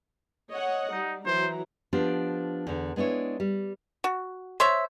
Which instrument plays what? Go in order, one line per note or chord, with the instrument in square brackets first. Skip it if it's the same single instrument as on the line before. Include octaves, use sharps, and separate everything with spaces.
[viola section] C#5 D#5 F#5
[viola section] G3 [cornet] D#4
[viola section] E3 F#3 A#5 [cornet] C5
[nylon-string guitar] F3 B3 D4 G4 C5
E2 D3
G#3 B3 D4 E4 C#5
G3
[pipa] F#4
C5 C#5 E5